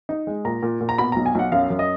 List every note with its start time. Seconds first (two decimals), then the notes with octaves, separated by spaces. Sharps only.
0.09 D#4
0.27 G#3
0.45 A#2 A#5
0.62 A#2
0.81 A#2
0.89 A#5
0.98 B2 B5
1.12 B1 A#5
1.26 G#5
1.35 B1 F#5
1.52 F#2 F5
1.70 F#2
1.79 D#5